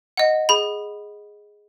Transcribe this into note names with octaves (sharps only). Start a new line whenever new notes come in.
D#5 F#5
G#4 B5